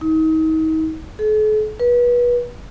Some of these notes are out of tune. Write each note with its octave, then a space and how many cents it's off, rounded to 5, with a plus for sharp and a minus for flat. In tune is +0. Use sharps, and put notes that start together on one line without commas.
D#4 +35
A4 -45
B4 -30